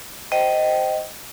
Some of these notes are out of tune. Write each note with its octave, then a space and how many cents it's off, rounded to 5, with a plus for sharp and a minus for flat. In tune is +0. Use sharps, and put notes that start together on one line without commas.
C5 +0 D#5 +0 G5 -20